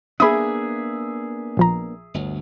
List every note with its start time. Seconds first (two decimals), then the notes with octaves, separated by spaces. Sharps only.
0.20 A#3 B3 D4 G#4 E5 B5 D#6
1.57 A#1 F3 A#5
2.14 G1 D2